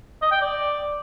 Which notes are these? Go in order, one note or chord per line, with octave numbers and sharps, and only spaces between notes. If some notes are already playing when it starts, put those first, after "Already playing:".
D#5
G5
D5